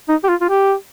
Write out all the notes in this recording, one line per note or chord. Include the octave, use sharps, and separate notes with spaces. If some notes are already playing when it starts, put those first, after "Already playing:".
D#4
G4
F4
F4
G4